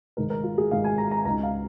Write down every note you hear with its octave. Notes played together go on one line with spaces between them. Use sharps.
G#1 G#2 G#3 D#4 A#4
A#4
F4
G#4
G#1 G#2 G#3 D#4 F5
G#5
A#5
A#5
C#2 C#3 G#3 D#4 A#5
F5